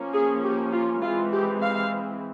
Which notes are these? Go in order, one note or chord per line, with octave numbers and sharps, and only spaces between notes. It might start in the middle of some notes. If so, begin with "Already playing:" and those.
Already playing: F3 A#3 C#4
G#4
G4
F4
E3 G#3 C4 F4
G4
F5